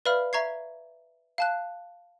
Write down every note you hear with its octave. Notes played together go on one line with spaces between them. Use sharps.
B4 D5 E5 F5 B5 F6
E5 A#5 C#6 G#6 C7
F5 A5 F#6